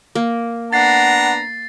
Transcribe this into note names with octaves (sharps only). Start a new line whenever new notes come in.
A#3
B3 D4 F#5 A#5 A6 C7